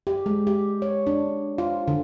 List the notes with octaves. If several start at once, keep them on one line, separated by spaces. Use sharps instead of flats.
G4
G#3
G4
C#5
D4
F4
D3